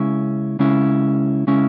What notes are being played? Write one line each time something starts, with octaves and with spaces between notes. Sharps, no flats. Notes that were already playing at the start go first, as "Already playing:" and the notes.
Already playing: C#3 G#3 C#4 E4
C#3 G#3 C#4 E4
C#3 G#3 C#4 E4